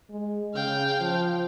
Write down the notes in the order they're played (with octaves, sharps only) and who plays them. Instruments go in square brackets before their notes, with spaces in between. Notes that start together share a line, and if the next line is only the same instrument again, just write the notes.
[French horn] G#3
[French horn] C#3 [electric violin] F5 G5
[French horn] F3